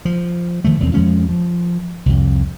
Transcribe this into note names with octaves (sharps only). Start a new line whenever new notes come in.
F3
D#3 F3 A3
E1 E2 F#3 C4
F2 F3 G#3 C#4
F3
C2 F2